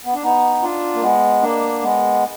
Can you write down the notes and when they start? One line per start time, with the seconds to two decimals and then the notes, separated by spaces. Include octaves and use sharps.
0.05 B3
0.14 D4
0.23 B3 D#4
0.62 D4 F4
0.95 A#3
1.02 G#3 B3
1.42 A#3 D4
1.82 G#3 B3